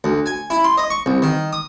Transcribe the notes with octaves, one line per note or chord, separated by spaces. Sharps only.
D2
G#5
E4
C6
D#5
C#6
C2
D#3
D#6